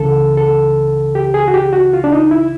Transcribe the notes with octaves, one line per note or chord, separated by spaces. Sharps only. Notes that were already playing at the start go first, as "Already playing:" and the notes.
Already playing: C#2 C#3 E3 A4
A4
G4
G#4
F#4
G4
F#4
F4
D4
D#4
E4